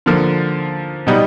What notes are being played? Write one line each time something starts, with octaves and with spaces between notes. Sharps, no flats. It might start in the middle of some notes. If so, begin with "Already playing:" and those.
D3 F3 A#3
B2 G3 B3 D#4